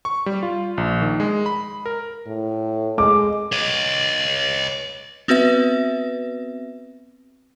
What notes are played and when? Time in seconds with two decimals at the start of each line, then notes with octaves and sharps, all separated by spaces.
0.05 C#6
0.26 G3
0.43 F4
0.78 A#1
1.02 D#3
1.20 G#3
1.46 B5
1.86 A#4
2.27 A2
2.98 G#3 D6
3.52 C#5 D#5
5.28 B3 C4 F#4 B4 E5